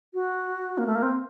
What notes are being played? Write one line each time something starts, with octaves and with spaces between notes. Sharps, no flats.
F#4
A#3
A3
A#3
C4